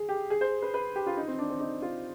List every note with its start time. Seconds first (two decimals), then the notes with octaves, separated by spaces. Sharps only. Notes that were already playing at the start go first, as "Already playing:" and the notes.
Already playing: G#4
0.09 G4
0.30 G#4
0.41 C5
0.62 B4
0.74 B4
0.96 G4
1.06 F4
1.17 D#4
1.28 C4
1.39 D4
1.49 C4
1.60 D#4
1.82 F4